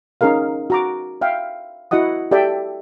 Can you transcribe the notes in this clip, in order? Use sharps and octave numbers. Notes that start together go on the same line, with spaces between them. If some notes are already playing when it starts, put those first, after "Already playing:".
C#4 D#4 G#4 A#4 F5
F#4 A#5 D6
E5 F5 G5
E4 F#4 D#5 F#5 D#6
G4 A4 D5 E5 G5